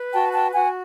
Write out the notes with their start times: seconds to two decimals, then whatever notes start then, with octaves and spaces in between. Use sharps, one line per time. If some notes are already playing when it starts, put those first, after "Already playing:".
Already playing: B4
0.12 F#4 G5 A5
0.32 G5 A5
0.53 F#4 F#5 G#5